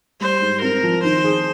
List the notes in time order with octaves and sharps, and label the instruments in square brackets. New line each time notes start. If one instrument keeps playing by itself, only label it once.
[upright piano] G3 [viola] C5
[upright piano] G#2
[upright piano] C4 [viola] A#4
[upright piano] F3
[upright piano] D#3 [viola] C5
[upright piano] G#4